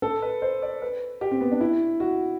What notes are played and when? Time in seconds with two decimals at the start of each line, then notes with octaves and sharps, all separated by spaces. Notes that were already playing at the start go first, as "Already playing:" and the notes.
0.02 A4
0.22 B4
0.42 C5
0.62 D5
0.82 B4
1.21 G4
1.31 C4
1.41 B3
1.51 D4
1.61 E4
2.00 F#4